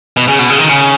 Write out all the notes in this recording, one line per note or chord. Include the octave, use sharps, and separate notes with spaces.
B2
C#3
B2
C#3
D#3
C#3